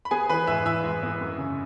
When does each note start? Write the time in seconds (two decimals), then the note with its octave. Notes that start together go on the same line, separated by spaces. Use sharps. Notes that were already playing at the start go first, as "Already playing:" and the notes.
0.05 B5
0.11 B3 G#4 G#5
0.29 E3 B4 B5
0.47 G#2 E5 E6
0.66 E3 E5 E6
0.84 G#2
1.03 B3
1.21 F#2
1.38 C#3